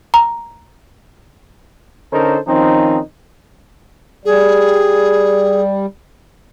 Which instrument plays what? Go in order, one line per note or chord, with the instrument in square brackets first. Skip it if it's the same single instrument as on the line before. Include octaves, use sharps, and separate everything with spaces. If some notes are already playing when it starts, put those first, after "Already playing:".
[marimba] A#5
[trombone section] D3 C#4 D#4 A4 A#4 C5
D#3 F3 C4 C#4 D#4
[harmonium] G3 [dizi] G#4